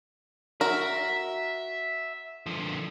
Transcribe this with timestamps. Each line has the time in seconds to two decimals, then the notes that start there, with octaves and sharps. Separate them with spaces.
0.61 F#4 A#4 E5
2.46 D3 F3